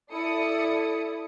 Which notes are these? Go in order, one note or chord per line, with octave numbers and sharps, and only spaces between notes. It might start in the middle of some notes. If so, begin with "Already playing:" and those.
E4 A4 D5 D#6 C#7